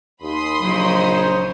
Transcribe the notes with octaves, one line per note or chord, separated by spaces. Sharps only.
D#2 B5 C6 D#6
A#1 C#3 F3 F#3 D#4 C5 C#5